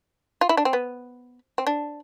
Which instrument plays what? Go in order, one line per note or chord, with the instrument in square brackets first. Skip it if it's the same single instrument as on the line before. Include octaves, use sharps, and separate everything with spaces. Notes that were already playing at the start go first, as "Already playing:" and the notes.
[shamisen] F4
E4
D4
C4
B3
C4
D4